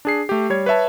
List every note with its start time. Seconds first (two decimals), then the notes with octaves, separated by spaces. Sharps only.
0.05 D4 G#4 C7
0.29 A3 G4
0.50 G3 C#5 G#6
0.66 B4 C#5 E5 A5